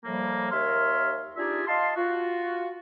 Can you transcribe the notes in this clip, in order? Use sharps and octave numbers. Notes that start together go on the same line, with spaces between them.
A2 F3 G3 A#3
D#2 A#4 C#5 E5 C6 F6
D4 D#4 F4 G4 G#4 E5
D#5 F5 A5 C6
F4 F#4